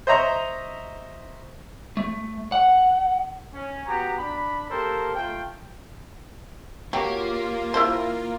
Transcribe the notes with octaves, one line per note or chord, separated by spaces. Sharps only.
C5 D#5 E5 A#5 C#6
A3
F#5
C#4
B3 F#4 G4 A#5
D4 B5
A#3 G4 A4 A#4 C5
A3 F4 G5
F#3 A#3 F4 G4
E4 A#4 C5